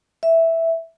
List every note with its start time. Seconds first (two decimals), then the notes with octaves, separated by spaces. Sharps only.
0.23 E5